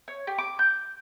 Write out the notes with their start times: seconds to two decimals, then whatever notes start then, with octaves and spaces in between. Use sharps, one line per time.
0.08 C#5
0.27 G4
0.38 D6
0.59 G6